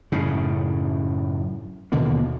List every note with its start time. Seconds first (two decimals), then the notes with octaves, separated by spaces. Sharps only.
0.12 F#2 A2 C#3
1.92 D#2 B2 D3 A#3